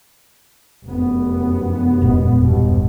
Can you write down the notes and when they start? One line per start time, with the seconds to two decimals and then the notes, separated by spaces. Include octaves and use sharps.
0.85 F1 F#2 B3
2.02 E1 A#2 G#3
2.40 B1 G2 B2